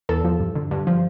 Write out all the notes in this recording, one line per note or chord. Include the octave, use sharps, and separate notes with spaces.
E2 A4
F3
G2
D3
G2
F3